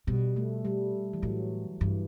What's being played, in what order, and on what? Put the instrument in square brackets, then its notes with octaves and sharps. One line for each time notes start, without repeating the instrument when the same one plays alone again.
[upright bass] B2 [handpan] G3
[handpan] A3
G3
E3
[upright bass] A2 [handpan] F#3
[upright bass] G2 [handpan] E3